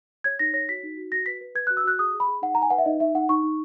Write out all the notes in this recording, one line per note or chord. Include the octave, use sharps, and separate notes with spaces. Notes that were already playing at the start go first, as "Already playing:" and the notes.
C#5 G#6
D#4 A#6
C#5 A#6
F#4 B6
D#4
F#4
F#4 A#6
B4 B6
B4
B4 G#6
F#6
F#4
E6
F#4 F#6
G#4 D#6
G#4
B5
G#4
D#4 F#5
D#4 A#5
G#5
B4 F#5
E5
D#4 D#5
D#4 E5
D#4 F#5
D#4 C#6
D#4